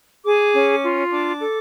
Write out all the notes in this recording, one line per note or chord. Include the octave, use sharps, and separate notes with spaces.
G#4 D6
C#4
F4
D4 D6
A4